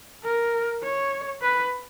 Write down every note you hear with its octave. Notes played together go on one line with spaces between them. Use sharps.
A#4
C#5
B4